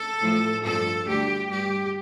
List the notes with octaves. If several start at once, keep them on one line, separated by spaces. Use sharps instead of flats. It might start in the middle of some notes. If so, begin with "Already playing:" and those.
Already playing: A4
A2 F3
G2 F3 A4
D2 D3 G3 G4
G2 G3 G4